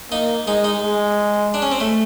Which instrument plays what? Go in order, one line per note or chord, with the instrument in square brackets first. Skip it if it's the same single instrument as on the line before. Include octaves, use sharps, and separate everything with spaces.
[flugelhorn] A#3 [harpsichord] D#4
[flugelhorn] G#3 [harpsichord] D#4
[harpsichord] D#4
[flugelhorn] G#3
[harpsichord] D4
C#4
C4
A3